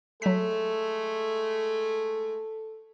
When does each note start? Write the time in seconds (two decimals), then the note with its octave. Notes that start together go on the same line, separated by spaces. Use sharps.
0.22 F#3 G#3 A3 A4 B6